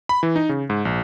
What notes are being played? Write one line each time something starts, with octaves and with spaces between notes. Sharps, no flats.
B5
E3
D#4
C#3
G#2
A#1